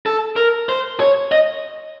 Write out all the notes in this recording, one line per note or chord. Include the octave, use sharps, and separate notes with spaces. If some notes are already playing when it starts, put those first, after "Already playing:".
A4
A#4
C5
C#5
D#5